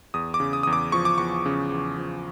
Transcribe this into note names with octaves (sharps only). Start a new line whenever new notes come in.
E2 D#6
D6
C#3
D#6
E2 D#6
D6
F3 C#6
D6
E2 C#6
C#3
E2
F3